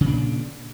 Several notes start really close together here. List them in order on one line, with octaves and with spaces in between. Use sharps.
C#3 A#2 D4